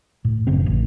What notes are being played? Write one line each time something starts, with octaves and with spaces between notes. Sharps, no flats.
A2
F#1 C#3 C4
A1